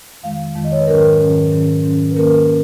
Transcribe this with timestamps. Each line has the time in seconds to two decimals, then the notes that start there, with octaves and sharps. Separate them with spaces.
0.23 F2 D#3 G#3 F5
0.55 F2 D#3 G#3
0.64 D#5
0.72 C#5
0.80 B4
0.87 G#2 D#3 F#3 C#4 A#4
1.20 G#2 D#3 F#3 C#4
1.51 G#2 D#3 F#3 C#4
1.84 G#2 D#3 F#3 C#4
2.11 B4
2.15 D#3 A#3 C#4 A#4
2.48 C#4